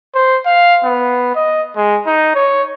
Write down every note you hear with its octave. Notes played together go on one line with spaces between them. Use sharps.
C5
F5
B3
D#5
G#3
D#4
C#5